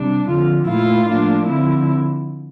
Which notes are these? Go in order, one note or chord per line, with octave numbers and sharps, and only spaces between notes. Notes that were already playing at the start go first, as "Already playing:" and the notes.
Already playing: C3 G3 D4
F2 D3 F3 F4
A#2 A3 E4 F4
A2 F3 A#3 D4
D3 F3 C4 E4